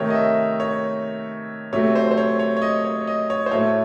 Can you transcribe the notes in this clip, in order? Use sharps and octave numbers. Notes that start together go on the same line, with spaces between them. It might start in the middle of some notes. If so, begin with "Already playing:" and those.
Already playing: C3 D#3 A3 C#5
D#5
E5
C#5
C3 F#3 A3 C#5
C5
C5
C#5
C#5
C#5
D#5
C#5
D#5
C#5
C5
A2 F#3 A3 C#5